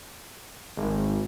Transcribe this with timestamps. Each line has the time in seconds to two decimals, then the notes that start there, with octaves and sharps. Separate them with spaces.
0.77 G#1